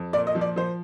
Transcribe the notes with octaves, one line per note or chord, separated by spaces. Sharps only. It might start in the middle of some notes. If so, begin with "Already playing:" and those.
Already playing: F2
A#2 D5
D#5
F3
D5
F3 C5